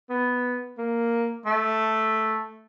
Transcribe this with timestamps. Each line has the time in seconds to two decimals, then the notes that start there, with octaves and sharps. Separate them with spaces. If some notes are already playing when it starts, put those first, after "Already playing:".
0.09 B3
0.78 A#3
1.46 A3